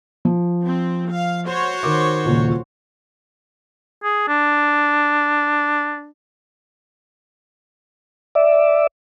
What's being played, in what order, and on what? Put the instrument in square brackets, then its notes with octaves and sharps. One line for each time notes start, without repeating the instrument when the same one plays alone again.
[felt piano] F3
[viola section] C4
F5
F#4 C5 C#5
[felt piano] D#3 A#4 D6
D#1 C#2 A#2
[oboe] G#4
D4
[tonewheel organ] D5 E5